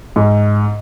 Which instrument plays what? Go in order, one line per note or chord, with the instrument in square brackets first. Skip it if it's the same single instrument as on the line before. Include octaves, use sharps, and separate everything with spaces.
[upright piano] G#2